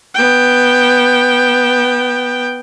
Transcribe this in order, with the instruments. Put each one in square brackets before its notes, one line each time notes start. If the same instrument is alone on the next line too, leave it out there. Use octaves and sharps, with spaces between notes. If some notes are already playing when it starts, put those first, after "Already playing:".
[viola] B3 G5